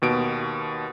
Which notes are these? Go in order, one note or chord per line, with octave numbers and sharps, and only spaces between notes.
D#2 B2 D7